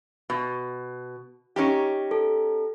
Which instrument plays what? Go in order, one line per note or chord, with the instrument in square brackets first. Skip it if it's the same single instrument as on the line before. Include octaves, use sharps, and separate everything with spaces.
[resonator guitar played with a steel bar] B2
C#4 D#4 G4
[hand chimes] A4